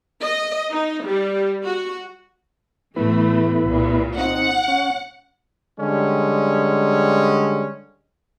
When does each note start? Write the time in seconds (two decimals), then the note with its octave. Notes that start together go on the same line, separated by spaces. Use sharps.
0.21 D#5
0.70 D#4
1.04 G3
1.64 F#4
2.96 A2 E3 A3 B3 E4 B4
3.66 C2 A#2
4.18 C4 D#4 F#5
4.68 C#4
5.80 D3 G3 G#3 C#4